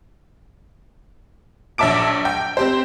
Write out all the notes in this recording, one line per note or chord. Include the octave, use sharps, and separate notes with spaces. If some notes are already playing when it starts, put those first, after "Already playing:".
A#1 F#3 E5 A5 D6 D7
G5
C4 G4 C5